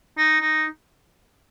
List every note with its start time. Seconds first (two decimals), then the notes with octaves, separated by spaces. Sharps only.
0.17 D#4
0.40 D#4